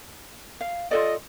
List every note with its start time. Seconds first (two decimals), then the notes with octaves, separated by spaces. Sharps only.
0.61 F5
0.91 F4 A4 D5 D#5